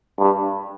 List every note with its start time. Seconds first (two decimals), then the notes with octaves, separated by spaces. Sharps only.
0.19 G2